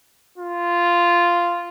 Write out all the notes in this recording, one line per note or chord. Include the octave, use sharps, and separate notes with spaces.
F4